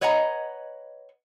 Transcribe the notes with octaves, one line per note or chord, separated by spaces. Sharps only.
B4 C#5 D#5 F#5 G#5 A#5